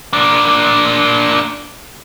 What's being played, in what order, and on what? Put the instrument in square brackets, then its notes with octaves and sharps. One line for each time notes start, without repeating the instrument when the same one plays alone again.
[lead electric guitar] A#3 D4